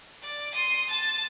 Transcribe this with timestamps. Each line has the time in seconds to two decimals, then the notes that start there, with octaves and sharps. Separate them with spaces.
0.22 D5
0.52 C6 D#6
0.89 A5 A6